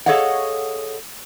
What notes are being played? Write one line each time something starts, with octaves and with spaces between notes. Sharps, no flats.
G#4 A4 C#5 D#5 F5 F#5